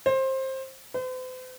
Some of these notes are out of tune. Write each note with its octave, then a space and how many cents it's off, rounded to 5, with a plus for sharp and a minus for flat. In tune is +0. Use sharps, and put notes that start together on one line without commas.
C5 +20
C5 -45